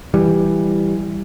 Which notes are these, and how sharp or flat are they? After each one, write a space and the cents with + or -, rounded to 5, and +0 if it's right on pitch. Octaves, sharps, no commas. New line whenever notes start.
E3 +0 G3 +0